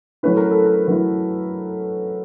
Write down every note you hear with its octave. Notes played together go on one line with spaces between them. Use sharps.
F#3 A3 C#4 E4 B4
A#4
A4
A#4
F#3 A3 C#4 E4 B4